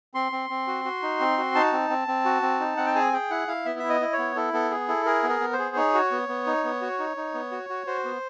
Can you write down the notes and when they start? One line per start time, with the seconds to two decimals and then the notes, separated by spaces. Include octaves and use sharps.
0.14 C4 C6
0.32 C4
0.50 C4
0.67 F#4
0.85 F#4
1.02 D#4
1.20 C4
1.37 F#4
1.55 D#4 A5
1.73 C4
1.90 C4
2.08 C4
2.25 F#4
2.42 C4
2.60 D#4
2.77 C4 F#5
2.86 G5
2.95 G#4 G#5
3.13 G#4 G5
3.30 E4 F#5
3.48 E4 F5
3.66 B3 E5
3.79 E4 E5
3.89 D#5
4.01 E4
4.13 C#5
4.18 B3
4.36 E4 A4
4.53 B3 A4
4.71 G#4
4.88 E4 A4
5.06 G#4 A#4
5.23 B3
5.29 A#4
5.41 B3
5.53 C5
5.59 G#4
5.76 D#4 C#5
5.94 F#4
6.11 B3
6.29 B3
6.47 D#4
6.64 B3
6.81 F#4
6.99 D#4
7.17 D#4
7.34 B3
7.51 F#4
7.69 F#4
7.87 F#4 C5
8.05 B3